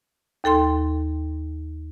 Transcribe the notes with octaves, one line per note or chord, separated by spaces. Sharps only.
D#2 A4 G5 C6